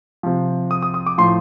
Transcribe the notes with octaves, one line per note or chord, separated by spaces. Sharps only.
C3 F3
D#6
D#6
D#6
D6
A2 F3 C6